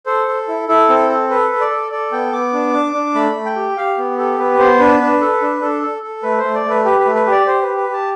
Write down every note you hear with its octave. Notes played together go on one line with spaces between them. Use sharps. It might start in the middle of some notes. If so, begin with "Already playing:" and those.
A4 C5
A4
E4
E4 A4
C4
A4
A4 B4
A4
D5
A4
A4 D5
B3 G5
B3 D6
D4
D4
D4
A3 B5
A3
G5
G4
G4 F5
B3
G4 A4
B3 B4
B3 C5
D4 B4
D4
A4
D4
D4 A4
A4
A4
A3 B4
A3 C5
D5
A3 B4
G4 B4
B4
A3
B4
G4 D5
G4 C5
B4
G4
B4
G4 A5